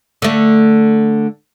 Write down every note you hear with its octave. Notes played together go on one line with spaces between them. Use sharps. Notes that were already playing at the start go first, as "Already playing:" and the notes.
D3 A3